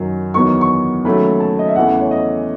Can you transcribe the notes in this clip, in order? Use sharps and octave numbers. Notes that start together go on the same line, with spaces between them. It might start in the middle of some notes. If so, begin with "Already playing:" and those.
Already playing: F#2 D#3 F#3
E2 D#3 F#3 B3 C#6
C#6
D#2 C#3 F#3 A3 B5
A5
D#5
E5
E2 C#3 E3 A3 F#5
C#5
D#5